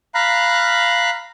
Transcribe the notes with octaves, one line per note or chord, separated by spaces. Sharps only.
F5 A#5 B5 F#6